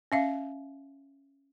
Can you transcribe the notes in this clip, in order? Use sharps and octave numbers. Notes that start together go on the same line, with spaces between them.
C#4 E5 F5